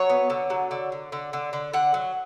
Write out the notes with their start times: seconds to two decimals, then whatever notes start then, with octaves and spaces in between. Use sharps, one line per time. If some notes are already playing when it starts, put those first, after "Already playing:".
Already playing: F#3 C#5
0.10 B3
0.30 D3
0.50 F#3
0.71 D3
0.92 D3
1.12 D3
1.33 D3
1.53 D3
1.73 D3 F#5
1.94 F#3